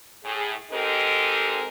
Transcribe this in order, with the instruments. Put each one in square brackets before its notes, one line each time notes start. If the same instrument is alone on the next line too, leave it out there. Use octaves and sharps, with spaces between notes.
[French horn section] A2 G#4
G#3 C4 D#4 G4 A4 A#4